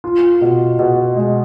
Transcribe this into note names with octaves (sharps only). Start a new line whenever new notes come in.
F4
B2
B2
G#3